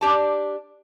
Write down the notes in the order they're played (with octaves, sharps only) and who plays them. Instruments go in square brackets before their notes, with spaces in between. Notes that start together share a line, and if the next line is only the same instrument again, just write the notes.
[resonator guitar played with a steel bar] D4 G4 A5